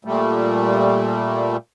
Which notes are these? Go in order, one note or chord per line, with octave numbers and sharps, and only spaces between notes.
A#2 G3 A3